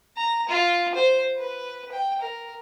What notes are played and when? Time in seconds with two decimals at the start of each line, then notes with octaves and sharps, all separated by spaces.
0.17 A#5
0.49 F4
0.95 C5
1.38 B4
1.92 G5
2.21 A#4